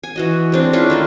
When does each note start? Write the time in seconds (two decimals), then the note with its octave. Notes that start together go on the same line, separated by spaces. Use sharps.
0.03 G#5
0.16 E3 F#4 D#5
0.52 G#3 C4 D4
0.73 C#4 D4 E4 F4
0.90 D#3 A3 A#3